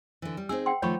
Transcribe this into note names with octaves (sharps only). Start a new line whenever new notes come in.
D3 E3
G3
C4 D#4 G#4 E6
F#5 G5 C6
D#3 F3 A3 C#5 B5 C#6